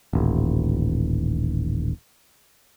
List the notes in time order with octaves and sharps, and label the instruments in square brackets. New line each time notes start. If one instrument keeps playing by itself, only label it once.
[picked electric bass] D#1 A1